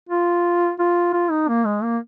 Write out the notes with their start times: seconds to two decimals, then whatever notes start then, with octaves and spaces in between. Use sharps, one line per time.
0.09 F4
0.79 F4
1.13 F4
1.31 D#4
1.49 A#3
1.65 G#3
1.83 A#3